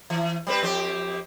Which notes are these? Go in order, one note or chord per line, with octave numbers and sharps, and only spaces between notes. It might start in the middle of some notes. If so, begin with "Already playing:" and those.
E3
G3 C4 B4
F2 C4 G4